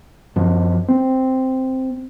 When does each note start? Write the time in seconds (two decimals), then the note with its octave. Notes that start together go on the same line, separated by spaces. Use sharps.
0.36 F#2 F3
0.88 C4